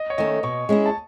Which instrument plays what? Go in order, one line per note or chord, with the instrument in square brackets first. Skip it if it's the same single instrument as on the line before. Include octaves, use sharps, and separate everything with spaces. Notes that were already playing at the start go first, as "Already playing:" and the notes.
Already playing: [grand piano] D#5
C#5
[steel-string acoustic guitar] D#3 A3 C#4 [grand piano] D#5
[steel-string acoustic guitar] B2 [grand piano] C#6
[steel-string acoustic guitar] G#3 C#4 E4
[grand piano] A5